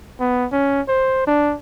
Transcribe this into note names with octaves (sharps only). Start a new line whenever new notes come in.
B3
C#4
C5
D4